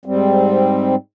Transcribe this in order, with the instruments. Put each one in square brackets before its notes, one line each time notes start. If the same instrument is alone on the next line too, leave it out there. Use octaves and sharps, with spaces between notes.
[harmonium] G#2 G3 C4